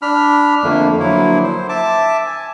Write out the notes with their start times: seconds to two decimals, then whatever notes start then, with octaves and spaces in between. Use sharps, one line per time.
0.02 D4 B5 F6
0.64 F2 D3 A3 A#3
1.00 D3 F3 F#3 A#3 E4
1.44 C5
1.69 E5 A5 D6
2.26 G#5